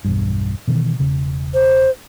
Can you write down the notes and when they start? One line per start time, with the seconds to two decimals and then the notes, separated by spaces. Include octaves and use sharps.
0.05 B1 E2 G2
0.67 B2 D#3 E3
0.99 E1 C#3
1.54 C5